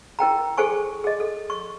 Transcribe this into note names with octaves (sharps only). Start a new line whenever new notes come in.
E4 A#4 G5 A#5
G#4 A4 C5 G#5 C#6
G#4 D#5
A4
C#6